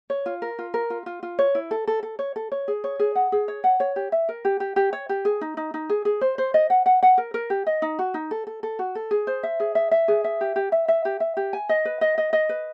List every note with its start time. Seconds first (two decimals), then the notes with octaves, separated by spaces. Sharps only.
0.10 C#5
0.26 F4
0.42 A#4
0.59 F4
0.74 A#4
0.90 F4
1.06 F4
1.23 F4
1.39 C#5
1.55 E4
1.71 A4
1.87 A4
2.03 A4
2.19 C#5
2.36 A4
2.52 C#5
2.68 G#4
2.84 C#5
2.99 G#4
3.15 F#5
3.32 G#4
3.48 C#5
3.64 F#5
3.80 C#5
3.96 G4
4.12 E5
4.29 A#4
4.45 G4
4.60 G4
4.76 G4
4.93 C#5
5.09 G4
5.25 G#4
5.41 D#4
5.57 D#4
5.74 D#4
5.90 G#4
6.05 G#4
6.21 C5
6.38 C5
6.54 D#5
6.70 F#5
6.86 F#5
7.03 F#5
7.18 A#4
7.34 A#4
7.50 G4
7.67 D#5
7.82 D#4
7.99 F#4
8.14 D#4
8.31 A4
8.47 A4
8.63 A4
8.79 F#4
8.95 A4
9.11 G#4
9.27 C5
9.43 E5
9.60 G#4
9.75 E5
9.91 E5
10.08 G#4
10.24 E5
10.41 G4
10.56 G4
10.72 E5
10.88 E5
11.05 G4
11.20 E5
11.37 G4
11.53 G#5
11.69 D#5
11.85 B4
12.01 D#5
12.18 D#5
12.33 D#5
12.49 B4